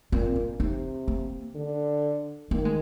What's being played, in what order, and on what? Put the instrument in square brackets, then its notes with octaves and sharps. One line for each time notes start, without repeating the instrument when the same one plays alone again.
[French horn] A#2 [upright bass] C4
[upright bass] D4
[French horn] C3 [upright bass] D#4
[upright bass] A#3
[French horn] D3
[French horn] D#3 [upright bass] A#3
[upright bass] G#3